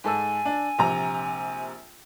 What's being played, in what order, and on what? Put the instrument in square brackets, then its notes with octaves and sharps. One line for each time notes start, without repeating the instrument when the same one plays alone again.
[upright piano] G#2 A4 E6 [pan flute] G#5
[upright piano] D4
A#1 C3 A#5